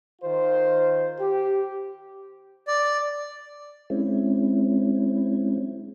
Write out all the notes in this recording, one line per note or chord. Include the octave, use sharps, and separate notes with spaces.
D#3 F4 C5
G4
D5
G#3 C4 C#4 E4